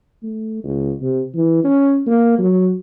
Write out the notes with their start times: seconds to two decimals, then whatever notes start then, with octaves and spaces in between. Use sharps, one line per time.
0.23 A3
0.64 C#2
1.01 C3
1.35 E3
1.64 C#4
2.06 A#3
2.38 F#3